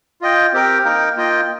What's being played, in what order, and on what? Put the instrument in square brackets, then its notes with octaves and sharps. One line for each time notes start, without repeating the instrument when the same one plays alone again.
[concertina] F4 D#5 G5
C4 G4 A#4 G5
A#3 D#4 A#4 G5
A#3 F4 D#5 G5